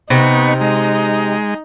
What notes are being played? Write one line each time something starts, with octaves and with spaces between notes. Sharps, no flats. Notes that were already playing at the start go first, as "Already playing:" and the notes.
C3 B3 D#4 C#6
G#3 D#4